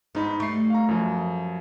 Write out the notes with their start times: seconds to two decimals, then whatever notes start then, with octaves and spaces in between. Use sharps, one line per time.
0.15 G#2 B3 D#4 B5
0.40 G3 A3 C#6 C7
0.70 F5 A#5
0.88 F#2 F3